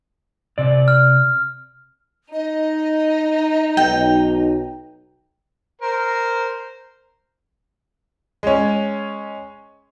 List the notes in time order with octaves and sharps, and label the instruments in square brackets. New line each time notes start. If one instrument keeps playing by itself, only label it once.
[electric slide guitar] C3 D5
[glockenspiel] F6
[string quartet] D#4 [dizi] D#5
[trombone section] B1 [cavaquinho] G5
[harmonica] A#4 C5
[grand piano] G#3 C#4